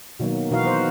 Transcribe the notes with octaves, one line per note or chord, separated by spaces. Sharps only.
B2 D#3 F#3 A#3
B2 E3 D#4 F#4 B4 F5
C5